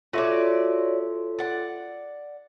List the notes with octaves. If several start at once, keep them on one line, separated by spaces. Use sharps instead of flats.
F4 F#4 A4 C#5 D5 E5
D5 F#5